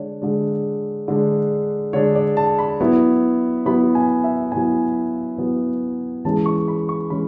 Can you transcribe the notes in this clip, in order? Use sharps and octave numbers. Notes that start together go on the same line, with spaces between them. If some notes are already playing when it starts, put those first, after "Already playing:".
Already playing: D3 G#3 D4 C#5
D3 G#3 D4
D3 G#3 D4
D3 G#3 D4 C#5
D5
A5
B5
F#3 B3 E4
F#3 B3 E4 B5
G#5
E5
F#3 B3 E4 G#5
F#3 B3 E4
E3 G#3 C#4 A5
C#6
B5
C#6
E3 G#3 C#4 B5